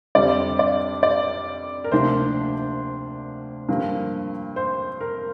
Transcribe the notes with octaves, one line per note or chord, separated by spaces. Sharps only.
F2 D3 G3 C4 D5
D5
D5
A#4
D2 C3 F3 A#3 D4 C5
G2 D3 F3 A#3
C5
A#4